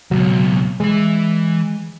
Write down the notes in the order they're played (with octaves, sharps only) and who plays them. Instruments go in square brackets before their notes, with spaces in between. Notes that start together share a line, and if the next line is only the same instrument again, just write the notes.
[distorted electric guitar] C#2 B2 [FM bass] F#3
[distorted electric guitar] E3 B5 [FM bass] G#3